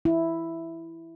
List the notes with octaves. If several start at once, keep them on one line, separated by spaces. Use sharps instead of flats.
E4